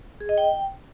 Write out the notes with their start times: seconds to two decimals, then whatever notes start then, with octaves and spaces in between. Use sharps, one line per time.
0.21 G#4
0.29 D#5
0.38 G5